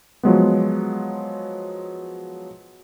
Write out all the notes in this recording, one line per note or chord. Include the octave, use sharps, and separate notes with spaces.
F3 F#3 G#3 B3